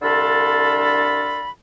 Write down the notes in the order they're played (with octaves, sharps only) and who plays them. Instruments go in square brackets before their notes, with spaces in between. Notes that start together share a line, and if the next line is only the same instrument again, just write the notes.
[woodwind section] C2 D3 D4 F4 A4 B5